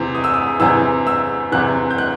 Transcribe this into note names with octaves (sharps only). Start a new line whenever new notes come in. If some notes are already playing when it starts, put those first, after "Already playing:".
Already playing: E2 C3 E3
D#6
E6
D#6
E2 C3 E3 E6
E6
E2 C3 E3 F#6
G6
F#6